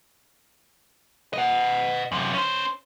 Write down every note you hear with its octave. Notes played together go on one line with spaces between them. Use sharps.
D#5 F#5
F#2 C3
C#4 C5